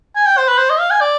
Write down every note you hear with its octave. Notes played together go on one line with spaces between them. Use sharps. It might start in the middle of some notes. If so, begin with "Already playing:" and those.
G#5
G5
C5
B4
C5
D#5
F5
G#5
D5